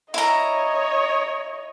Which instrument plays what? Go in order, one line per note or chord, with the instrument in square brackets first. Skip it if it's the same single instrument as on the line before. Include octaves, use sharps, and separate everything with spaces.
[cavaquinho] E4 A#5 [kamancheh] C#5 D#5